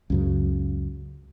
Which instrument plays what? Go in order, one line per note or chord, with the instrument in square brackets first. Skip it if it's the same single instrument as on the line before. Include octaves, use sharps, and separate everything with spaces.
[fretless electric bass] C#2 F#2 C#3